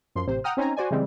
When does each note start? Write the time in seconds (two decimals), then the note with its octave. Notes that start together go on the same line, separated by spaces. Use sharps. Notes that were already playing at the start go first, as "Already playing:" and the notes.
0.15 F#2 F3 C6
0.27 A1 C3 C5
0.44 F#5 G5 A#5 D#6 F6
0.57 C4 C#4 D#4 C5 G#5 A#5
0.77 F#4 C5 D5 G#5
0.91 C#3 E3 G3 G#3 C4